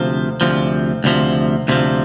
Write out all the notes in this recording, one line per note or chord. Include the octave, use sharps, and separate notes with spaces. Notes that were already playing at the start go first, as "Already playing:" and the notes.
Already playing: D2 C3 F3
D2 C3 F3
D2 C3 F3
D2 C3 F3